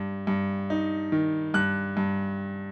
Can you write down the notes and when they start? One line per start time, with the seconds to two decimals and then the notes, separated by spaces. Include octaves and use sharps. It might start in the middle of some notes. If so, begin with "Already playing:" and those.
Already playing: G2
0.27 G2
0.70 D#4
1.12 D#3
1.54 G2 F#6
1.97 G2